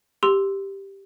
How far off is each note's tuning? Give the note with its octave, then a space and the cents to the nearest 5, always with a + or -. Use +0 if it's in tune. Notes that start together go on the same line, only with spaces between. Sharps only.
G4 +0 C6 +0 E6 +0